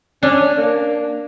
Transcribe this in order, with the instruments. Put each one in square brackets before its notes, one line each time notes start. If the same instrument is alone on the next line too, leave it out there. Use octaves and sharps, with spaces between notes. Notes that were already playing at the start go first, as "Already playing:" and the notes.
[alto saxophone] C#4 [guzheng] D4
[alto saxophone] A#3